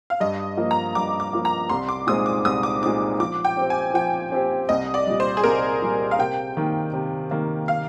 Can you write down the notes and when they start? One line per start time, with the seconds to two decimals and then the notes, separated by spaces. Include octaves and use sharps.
0.10 F5
0.20 G2 D#5
0.57 F3 A#3
0.71 A#5
0.95 G2 D6
1.20 D6
1.33 F3 A#3
1.45 A#5
1.70 C2 C6
1.89 D6
2.07 A#2 G#3 C4 D#4 D#6
2.26 D6
2.45 C2 D#6
2.63 D6
2.82 A#2 G#3 C4 D#4 D6
3.20 F3 D6
3.45 G5
3.57 C4 G4 C5
3.70 G#5
3.94 F3 G5
4.32 C4 G4 C5
4.69 C2 D#5
4.94 D5
5.07 A#2 G3
5.20 C5
5.37 G#4
5.44 C2 A#4
5.82 A#2 G3
6.11 F5
6.18 C3 G5
6.57 D#3 A#3
6.94 C3
7.31 D#3 A#3
7.68 F5